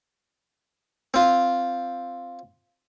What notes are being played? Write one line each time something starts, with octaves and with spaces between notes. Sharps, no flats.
C4 F4